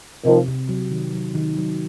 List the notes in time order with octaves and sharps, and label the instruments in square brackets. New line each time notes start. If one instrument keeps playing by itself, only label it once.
[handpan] C3 [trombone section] D#3 F3
[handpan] C3
F#3
D#3
F#3
D#3
F#3